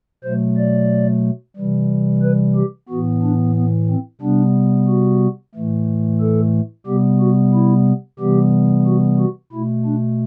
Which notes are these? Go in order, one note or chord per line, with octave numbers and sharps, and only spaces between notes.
B2 F#3 A3 C5
D5
C3 E3 G3
B4
G4
A2 E3 B3 F#4
D4
B3
C4
C3 G3 B3 D4
F#4
A2 E3 A3
A4
C3 G3 B3 G4
F#4
E4
C3 E3 G3 B3 G4
F#4
F#4
B2 A3 E4
D4